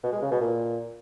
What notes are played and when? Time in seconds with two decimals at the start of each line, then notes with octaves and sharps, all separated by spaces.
0.04 B2
0.13 G#3
0.22 C#3
0.31 B2
0.41 A#2